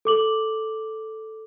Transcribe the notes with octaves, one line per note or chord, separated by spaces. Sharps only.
A4 D6 F#7